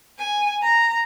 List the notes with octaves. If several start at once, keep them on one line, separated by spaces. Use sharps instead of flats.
G#5
A#5